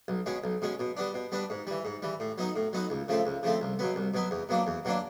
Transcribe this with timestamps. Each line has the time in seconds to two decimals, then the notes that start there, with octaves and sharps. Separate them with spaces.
0.08 B1
0.26 B2 G#3 C#4
0.44 B1
0.62 B2 G#3 C#4
0.80 B2
0.97 G3 B3 D4
1.14 B2
1.32 G3 B3 D4
1.50 G#2
1.67 E3 G3
1.85 G#2
2.02 E3 G3
2.20 A2
2.38 F#3 B3 D#4 F#4
2.56 A2
2.73 F#3 B3 D#4 F#4
2.90 C#2
3.08 C#3 F3 A3 C4
3.26 C#2
3.43 C#3 F3 A3 C4
3.61 C2
3.79 B2 F#3 B3
3.96 C2
4.14 B2 F#3 B3
4.31 E2
4.49 B2 F#3 A#3 D4
4.67 E2
4.85 B2 F#3 A#3 D4